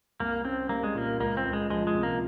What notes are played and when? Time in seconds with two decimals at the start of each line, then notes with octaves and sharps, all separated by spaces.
0.20 C2 A#3
0.45 C4 C#4
0.69 G3 A#3
0.84 G#3
0.95 A#2 A#3
1.20 C#2 A#3
1.37 C4
1.45 C#2
1.53 G#3
1.70 F3 G#3
1.87 G#3
1.94 C3
2.03 A#3